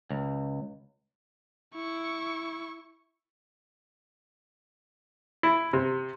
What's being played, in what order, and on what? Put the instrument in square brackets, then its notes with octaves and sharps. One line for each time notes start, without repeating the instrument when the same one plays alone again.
[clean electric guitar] C#2
[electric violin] E4 C#6
[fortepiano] E4
C3